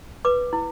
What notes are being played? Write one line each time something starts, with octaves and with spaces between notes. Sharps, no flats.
B4 D6
E4